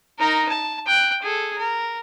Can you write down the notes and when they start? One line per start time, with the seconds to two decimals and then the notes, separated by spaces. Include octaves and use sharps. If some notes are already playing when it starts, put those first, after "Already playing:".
0.19 D#4 A#4
0.49 A5
0.87 G5 F#6
1.22 G#4 A4
1.58 A#4